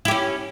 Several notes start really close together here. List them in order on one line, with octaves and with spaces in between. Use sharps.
E4 G4 C#4